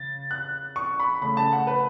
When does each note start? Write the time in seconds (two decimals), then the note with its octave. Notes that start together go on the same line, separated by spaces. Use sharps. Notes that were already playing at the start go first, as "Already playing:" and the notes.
Already playing: C#3 A6
0.31 F#6
0.76 C#6
1.00 B5
1.22 C#3 A3 B5
1.37 A5
1.53 F#5
1.67 B4